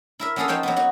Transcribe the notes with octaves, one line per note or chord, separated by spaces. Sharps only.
E4 A#4 E5
F#3 A#3 C#4 G#4 A4 F5
F3 D#4 C5 C#5 G5 A5
F#3 A#3 B3
D#4 F#4 C#5